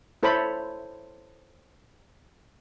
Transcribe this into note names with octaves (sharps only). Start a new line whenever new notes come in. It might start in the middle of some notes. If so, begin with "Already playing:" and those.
E4 A4 C5 C#5 B5